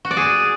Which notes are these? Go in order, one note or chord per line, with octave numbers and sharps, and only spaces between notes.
F#4
D5
G#4